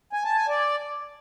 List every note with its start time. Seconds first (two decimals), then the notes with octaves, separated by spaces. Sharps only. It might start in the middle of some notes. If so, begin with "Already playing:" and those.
0.13 G#5
0.25 A5
0.37 G#5
0.48 D5